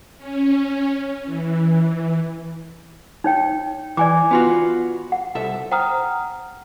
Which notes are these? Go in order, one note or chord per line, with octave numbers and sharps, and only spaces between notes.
C#4
E3
D#4 C#5 G5
E3 D5 G#5 D6
B3 F4 F#4
F#5
C2 A4 E5
C5 F#5 G5 A#5 D#6 F6